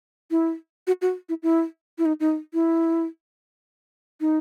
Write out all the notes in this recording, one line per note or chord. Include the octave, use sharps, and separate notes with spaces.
E4
F#4
F#4
E4
E4
E4
D#4
D#4
E4
D#4